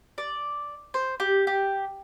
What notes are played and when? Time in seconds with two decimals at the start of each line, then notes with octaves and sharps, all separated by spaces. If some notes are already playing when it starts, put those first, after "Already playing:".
0.18 D5
0.94 C5
1.20 G4
1.47 G4